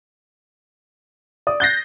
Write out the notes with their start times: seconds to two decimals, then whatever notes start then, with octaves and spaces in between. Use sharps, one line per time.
1.47 D5 D#6
1.60 F#6 G6 A6 A#6 C7